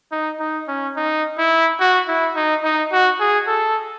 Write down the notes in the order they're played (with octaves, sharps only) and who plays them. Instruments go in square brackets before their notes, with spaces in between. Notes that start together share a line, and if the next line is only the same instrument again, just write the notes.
[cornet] D#4
D#4
C#4
D#4
E4
F#4
E4
D#4
D#4
F#4
G#4
A4